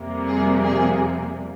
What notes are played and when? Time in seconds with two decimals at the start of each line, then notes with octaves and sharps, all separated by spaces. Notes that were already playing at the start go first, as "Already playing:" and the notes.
Already playing: F2 C3 G3 A#3
0.27 G#4
0.62 G#4